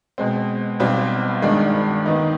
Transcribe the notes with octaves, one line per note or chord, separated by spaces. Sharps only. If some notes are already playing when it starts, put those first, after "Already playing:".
B2 G#3 C4
B1 B2 G3 C4
G#1 G2 D#3 G#3 D4
D#2 D#3 B3 D#4